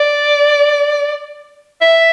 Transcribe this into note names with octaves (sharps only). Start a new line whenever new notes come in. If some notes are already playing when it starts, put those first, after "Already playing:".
Already playing: D5
E5